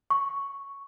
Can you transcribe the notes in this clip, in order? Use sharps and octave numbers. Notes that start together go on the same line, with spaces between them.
C#6